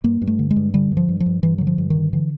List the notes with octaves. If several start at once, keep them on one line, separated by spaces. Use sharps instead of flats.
G2 A#3
G2
A3
D3
G#3
G2
D3 G3
G2
F3
G2
F3
G2
G2 E3
D3 F#3
F3
G2
D#3
D3
D3 E3